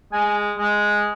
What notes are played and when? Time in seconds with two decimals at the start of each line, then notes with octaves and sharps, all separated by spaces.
0.12 G#3 G#5
0.57 G#3